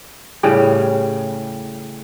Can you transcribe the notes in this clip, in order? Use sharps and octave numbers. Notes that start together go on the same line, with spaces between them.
A2 C#3 G3